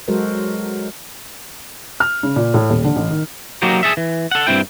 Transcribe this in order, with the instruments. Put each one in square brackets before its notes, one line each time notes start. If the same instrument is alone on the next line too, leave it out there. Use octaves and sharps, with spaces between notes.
[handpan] F#3 G#3 F#4 A4 A#4 C5
[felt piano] F6
C#3
A#2
A2
D#1
D3
A1
D#3
[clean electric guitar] F#3 A#3 D#4 F#4 G4
G#4 A4 E5
E3
A4 F#5
G2 B2 C4 E4 G5